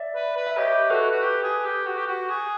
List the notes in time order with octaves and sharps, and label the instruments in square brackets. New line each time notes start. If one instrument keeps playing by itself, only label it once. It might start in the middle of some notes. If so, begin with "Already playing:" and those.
Already playing: [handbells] D5 E5
[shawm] B4
B4
[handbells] E5
[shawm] G4 [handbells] C#5 D#5
[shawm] F#4 [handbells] A4 B4
[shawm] F#4
G4
G#4
G4
F#4
G4
F#4
G#4